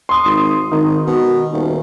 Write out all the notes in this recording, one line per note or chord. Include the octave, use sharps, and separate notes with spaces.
C6 D#6
G#1
G#1 D#3
B2
D#1